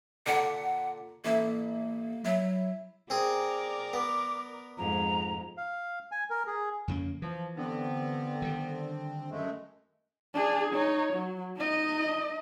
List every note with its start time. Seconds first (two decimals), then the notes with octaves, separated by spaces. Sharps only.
0.27 A#2 D3 F#5
1.25 A1 A#3 E4
2.25 F#3 E4
3.10 C4 G#4 A#4 D5
3.93 B3 D6
4.78 F2 G#2 A#5
5.57 F5
6.12 G#5
6.30 A#4
6.47 G#4
6.88 F2 C#3 A#3
7.22 E3 F3
7.57 G2 D3 B3 C4
8.42 D#3 G3
9.30 F#2 G#3 A3
10.34 D4 G#4
10.73 D#4 C#5
11.13 F#3
11.57 D#4 D#5